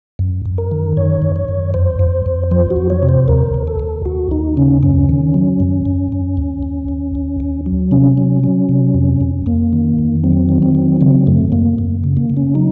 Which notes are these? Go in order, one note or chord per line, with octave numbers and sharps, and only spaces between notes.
F#2
F#2
A#4
D#3
F#2 C#5
F#2
C#5
F#2
F2 C5
F2
F2
F3 C5
F#4
F2
C#5
C3
C5
D#2 A#4
D#2
A4
D#2
D#2 F#4
D#2 D#4
C#3 C#4
F#2 C#4
D#3
F#3
F#2
F#2
F#2
D#2
D#2
D#2
D#2
D#2
F#3
C3 C#4
F#3
F#3
C3
F2
F2
F2 A#3
D#3
F2
F#3 C4
D#3
C4
F#3
C#3 C4
F#2 A3
F#2 A#3
F#2
C#3
A#3
C#3
C#4
F#3 D#4